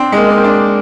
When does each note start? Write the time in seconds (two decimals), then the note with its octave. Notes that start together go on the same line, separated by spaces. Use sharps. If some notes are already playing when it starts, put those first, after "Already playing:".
Already playing: C4 D4
0.12 G#3
0.17 A#3
0.30 A#3
0.37 C4
0.44 D4